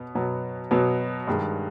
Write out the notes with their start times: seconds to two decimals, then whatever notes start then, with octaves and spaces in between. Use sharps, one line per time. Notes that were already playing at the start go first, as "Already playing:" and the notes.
Already playing: B2 B3
0.15 B2 F#3 B3
0.71 B2 F#3 B3
1.27 G2 D#3 G#3